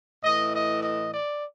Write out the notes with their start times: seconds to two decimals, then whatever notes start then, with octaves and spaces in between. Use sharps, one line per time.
0.24 A2 E3 D#5
0.54 D#5
0.83 D#5
1.13 D5